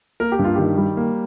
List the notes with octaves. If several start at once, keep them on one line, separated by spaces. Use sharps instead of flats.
A#3 A#4
G4
G2
F4
D#3 G4
G3
A#3